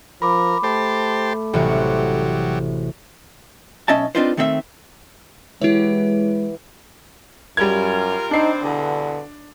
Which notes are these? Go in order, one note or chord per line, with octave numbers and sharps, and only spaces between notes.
F3 A#4 B5 D6
A3 G4 C5 A5
A1 C3 F#3 G3 F#4
B1 C#4 D#5 E5 A5
C4 D4 D#4 F4 B4 C5
D#3 A3 C4 A4 E5
E3 G#3 E4 F#4 G4 C#5
F#2 G3 F4 A#4 G#6
G2 C4 D4 D#4 C7
E2 G2 B2 D3